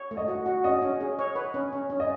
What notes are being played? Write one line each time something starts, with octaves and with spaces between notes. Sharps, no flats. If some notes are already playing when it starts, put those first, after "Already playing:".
Already playing: C#5
A3
D#5
F#4
F#4
C#4 D#5
C#4
G#4
C#5
B4
C#4
C#4
C#4
D#5